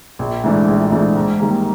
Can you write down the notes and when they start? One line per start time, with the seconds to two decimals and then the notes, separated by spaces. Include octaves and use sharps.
0.19 A#1
0.44 G#2 E3 A3 D4
0.68 A#1
0.92 G#2 E3 A3 D4
1.16 G#2
1.39 D#3 G3 A#3